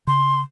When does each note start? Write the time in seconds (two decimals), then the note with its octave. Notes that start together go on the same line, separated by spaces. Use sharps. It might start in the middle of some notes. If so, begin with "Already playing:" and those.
0.07 C#3 C6